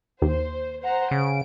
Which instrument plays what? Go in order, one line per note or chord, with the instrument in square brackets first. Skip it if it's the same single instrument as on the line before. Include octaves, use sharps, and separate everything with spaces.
[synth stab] D#2 [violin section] C5
[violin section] C5 F#5 A#5
[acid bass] C#3 [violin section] D7